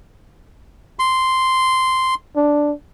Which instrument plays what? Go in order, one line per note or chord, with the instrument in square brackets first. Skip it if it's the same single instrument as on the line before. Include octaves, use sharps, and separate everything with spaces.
[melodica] C6
[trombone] D4